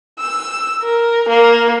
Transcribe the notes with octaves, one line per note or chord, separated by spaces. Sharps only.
E6
A#4
A#3